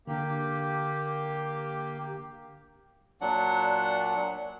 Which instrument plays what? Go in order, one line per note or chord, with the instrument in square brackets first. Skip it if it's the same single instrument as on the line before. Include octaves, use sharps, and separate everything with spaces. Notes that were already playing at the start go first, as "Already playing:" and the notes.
[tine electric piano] D3 D4 [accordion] A#3 G4
[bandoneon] A#2 F#3 D4 F#5